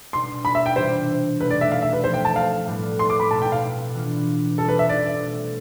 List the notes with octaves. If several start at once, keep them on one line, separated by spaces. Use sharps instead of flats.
B2 G3 D4 C6
B5
E5
G5
C3 E3 G3 D4 F4 C5
B2 A3 E4 B4
D5
E5
F5
E5
B4
F3 A3 C4 C5
G5
A5
F5
A2 G3 B3
C6
D6
B5
B2 B3 E4 A5
G5
F5
E3 B3 D4 F4
D3 G3 C4 F4 A4
B4
E5
D5
B2 A3 C4